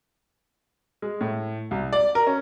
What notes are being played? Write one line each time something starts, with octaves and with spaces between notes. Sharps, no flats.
G#3
A2
C2
D5
A#4
C#4